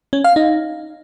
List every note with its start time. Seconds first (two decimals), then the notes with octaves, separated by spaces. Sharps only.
0.13 C#4
0.24 F5
0.36 D#4